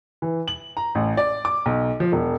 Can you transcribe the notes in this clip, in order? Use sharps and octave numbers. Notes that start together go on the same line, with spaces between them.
E3
F#7
A#5
A1
D5
D6
B1
F3
E1